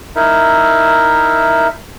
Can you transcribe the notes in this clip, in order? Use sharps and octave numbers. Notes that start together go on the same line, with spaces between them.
D#4 E4 A#4 E5